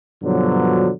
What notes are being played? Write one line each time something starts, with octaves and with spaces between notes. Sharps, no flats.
G2 B2 D3 F3 F#3